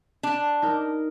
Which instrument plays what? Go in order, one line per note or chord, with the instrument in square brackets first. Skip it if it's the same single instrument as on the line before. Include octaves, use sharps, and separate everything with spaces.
[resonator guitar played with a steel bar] D4
[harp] D#4 A#4